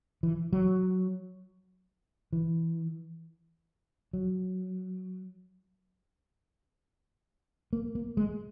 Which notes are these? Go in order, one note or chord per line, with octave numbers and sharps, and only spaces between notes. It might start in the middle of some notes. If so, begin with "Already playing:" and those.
E3
F#3
E3
F#3
A#3
A#3
G#3